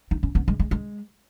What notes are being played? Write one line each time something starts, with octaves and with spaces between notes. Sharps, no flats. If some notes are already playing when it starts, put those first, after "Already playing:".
D#4
C#4
B3
G#3
G#3
G#3